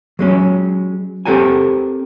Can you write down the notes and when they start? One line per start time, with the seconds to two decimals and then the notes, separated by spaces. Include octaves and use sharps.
0.19 F#3 G#3 C#4
1.25 C4 G4 A4 A#4 F#5 G#5